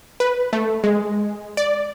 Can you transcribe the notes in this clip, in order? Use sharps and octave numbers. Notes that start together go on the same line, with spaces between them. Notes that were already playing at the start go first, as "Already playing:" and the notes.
B4
A3
G#3
D5